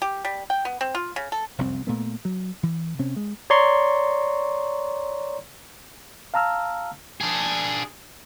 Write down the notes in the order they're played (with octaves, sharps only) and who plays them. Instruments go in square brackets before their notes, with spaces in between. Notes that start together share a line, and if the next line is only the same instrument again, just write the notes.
[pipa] G4
G3
G5
B3
C4
F4
C#3
A4
[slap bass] F1 C2 F#2 C4
A#2 A3 B3
F#3
E3
C3 C4 C#4
G#3
[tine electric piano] C#5 D5 A#5 C6 C#6
[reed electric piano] F5 A5 A#5 E6 F6
[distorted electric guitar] D4 G#4